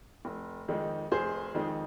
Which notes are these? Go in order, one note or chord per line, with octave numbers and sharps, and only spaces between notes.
F1
F2 D#3 G#3 D#4
F1 G#4 C5
F2 D#3 G#3 D#4